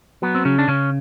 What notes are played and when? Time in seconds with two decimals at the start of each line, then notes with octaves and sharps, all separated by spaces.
0.22 F#3 B3
0.35 C4
0.45 C#3 C#4
0.59 D4
0.68 C#3 C#4